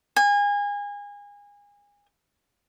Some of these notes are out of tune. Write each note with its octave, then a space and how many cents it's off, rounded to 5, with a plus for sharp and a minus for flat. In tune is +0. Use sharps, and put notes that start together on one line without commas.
G#5 -30